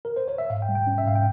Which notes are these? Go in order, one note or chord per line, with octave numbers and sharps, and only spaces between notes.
A#4
C5
C#5
E5
G#2 F5
G5
G3
G5
C#4
E5
G#2 F5
G5